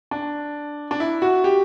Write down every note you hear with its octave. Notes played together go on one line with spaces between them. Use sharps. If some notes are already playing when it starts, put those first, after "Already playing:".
D4
D4
E4
F#4
G4